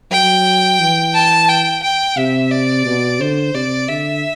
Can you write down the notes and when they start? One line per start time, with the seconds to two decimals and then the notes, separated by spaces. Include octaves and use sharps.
0.11 F#3 G5
0.80 E3
1.14 A5
1.49 G5
1.83 G5
2.17 C3 E5
2.51 D5
2.86 B2
3.21 D3 C5
3.54 C3 D5
3.89 D3 E5